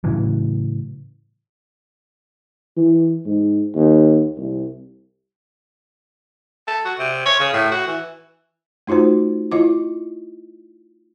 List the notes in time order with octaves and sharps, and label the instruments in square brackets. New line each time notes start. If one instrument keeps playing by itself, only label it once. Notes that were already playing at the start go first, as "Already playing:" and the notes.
[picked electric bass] A2 C#3 E3 F#3
[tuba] E3
G#2
D#2
C2
[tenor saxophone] A4
F#4
C3
C#5
C#3
A2
F#4
E3
[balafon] A3 D#4 F4 F#4 C5
E4 F4 D#5 D6